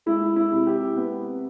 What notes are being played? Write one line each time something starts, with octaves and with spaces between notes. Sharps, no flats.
G#3 E4
E4
C3
G4
B3